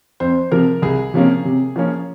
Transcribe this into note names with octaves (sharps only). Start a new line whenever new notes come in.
F2 C5
C3 F3 A#4
C2 G#4
C3 F3 A#3 C#4
C3
F3 A#3 C#4